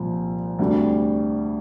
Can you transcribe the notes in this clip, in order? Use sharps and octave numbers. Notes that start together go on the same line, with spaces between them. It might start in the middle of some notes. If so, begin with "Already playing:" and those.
Already playing: C2 A#2 F3
D2 C3 G3 D4